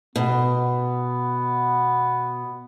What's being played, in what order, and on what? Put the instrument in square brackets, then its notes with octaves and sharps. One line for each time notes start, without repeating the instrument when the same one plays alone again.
[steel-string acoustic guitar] B2 [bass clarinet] B3